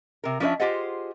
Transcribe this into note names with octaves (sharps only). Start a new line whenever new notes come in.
C3 A#4
F3 C#4 D4 B4 D#5 E5
F4 G4 G#4 C5 D#5 F#5